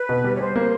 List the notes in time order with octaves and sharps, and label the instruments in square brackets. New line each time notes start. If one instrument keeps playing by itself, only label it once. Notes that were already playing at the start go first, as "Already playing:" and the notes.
Already playing: [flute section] B4
[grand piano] B2
G3
[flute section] C#5
[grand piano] G3 [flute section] C5
[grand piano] A#3